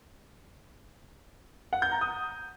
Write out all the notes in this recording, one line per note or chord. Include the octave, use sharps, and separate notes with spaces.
F#5
G6
A#5
D#6